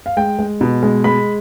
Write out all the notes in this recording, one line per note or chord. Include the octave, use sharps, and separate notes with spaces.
F5
G#3 G5
G#3
B2
G#3
G#3 B5